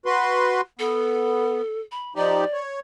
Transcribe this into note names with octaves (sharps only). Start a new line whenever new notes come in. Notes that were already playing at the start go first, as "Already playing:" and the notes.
F#4 B4 C6
B3 A4
B5
F3 D#4 G4 D5
C#5